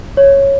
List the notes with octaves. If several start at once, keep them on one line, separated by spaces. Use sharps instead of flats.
C#5